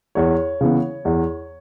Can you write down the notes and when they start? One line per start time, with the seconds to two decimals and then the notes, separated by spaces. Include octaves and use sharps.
0.15 E2 C#5
0.61 C#3 E3 B3
1.05 E2